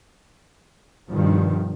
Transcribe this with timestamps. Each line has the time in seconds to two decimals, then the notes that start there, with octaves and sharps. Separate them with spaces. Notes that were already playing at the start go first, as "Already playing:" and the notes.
1.11 G2 B2 D#3 F3